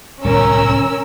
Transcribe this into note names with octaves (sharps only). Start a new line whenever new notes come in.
D1 C2 B2 C#4 A#4 E6